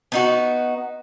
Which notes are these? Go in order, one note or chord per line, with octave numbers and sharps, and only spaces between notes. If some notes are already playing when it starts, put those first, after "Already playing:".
B3 D#4 F#4